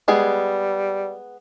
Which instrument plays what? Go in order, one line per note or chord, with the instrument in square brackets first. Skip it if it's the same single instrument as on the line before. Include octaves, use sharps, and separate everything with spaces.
[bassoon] G3 [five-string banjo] G#3 B3 G#4